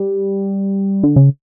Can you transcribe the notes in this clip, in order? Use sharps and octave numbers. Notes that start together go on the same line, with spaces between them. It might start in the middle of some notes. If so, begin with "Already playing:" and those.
Already playing: G3
D3
C#3